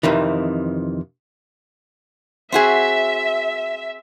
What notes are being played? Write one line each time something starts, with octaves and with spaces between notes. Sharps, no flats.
F2 C3 D#3 E3
C4 F#4 G#4 E5